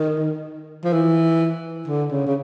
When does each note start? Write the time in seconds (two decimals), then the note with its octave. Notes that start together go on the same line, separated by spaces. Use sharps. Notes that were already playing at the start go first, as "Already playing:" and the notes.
Already playing: D#3
0.84 F3
0.93 E3
1.88 D3
2.11 C#3
2.27 C#3